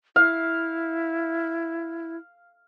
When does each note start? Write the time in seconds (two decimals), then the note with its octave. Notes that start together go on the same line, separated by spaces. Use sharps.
0.16 E4 F5